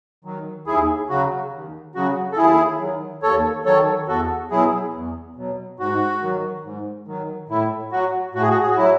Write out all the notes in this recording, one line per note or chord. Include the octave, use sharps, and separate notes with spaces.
D#3 F#3
D#2 E4 G#4
C#3 F#3 F#4
D#2
C#3 F#3 F#4
A4
D#2 E4 G#4
D#3 F#3
D#2 A4 C#5
D#3 F#3 A4 C#5
E2 F#4 A4
B2 F#3 E4 G#4
E2
B2 F#3
G#2 F#4
D#3 F#3
G#2
D#3 F#3
A2 E4
F#3 F#4
A2 F#4
G#4
F#4
G#4
F#4
F#3 E4